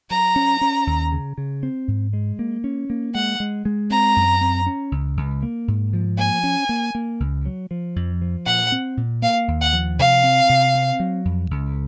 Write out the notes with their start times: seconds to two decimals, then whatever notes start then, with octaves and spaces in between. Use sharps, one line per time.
0.10 F#3 A#5
0.36 C#4
0.61 C#4
0.87 D#2
1.12 C#3
1.38 C#3
1.63 C4
1.88 G#2
2.13 G#3
2.39 A#3
2.64 C#4
2.90 A#3
3.15 G#3 F#5
3.40 G#3
3.65 G#3
3.90 C4 A#5
4.16 F#2
4.41 C4
4.66 C#4
4.92 C#2
5.17 C#2
5.43 A#3
5.68 G#2
5.93 F3
6.18 A#3 G#5
6.44 C#4
6.69 A#3
6.95 A#3
7.20 C#2
7.45 F#3
7.71 F3
7.96 F2
8.22 F3
8.46 A#2 F#5
8.72 C4
8.97 A#2
9.22 A#3 F5
9.48 D#2
9.61 F#5
9.73 F3
9.99 C3 F5
10.24 C4
10.49 C3
10.75 C4
11.00 F#3
11.25 F2
11.51 C#2